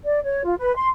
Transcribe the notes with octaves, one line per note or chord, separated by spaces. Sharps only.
D5
C#5
F4
B4
C6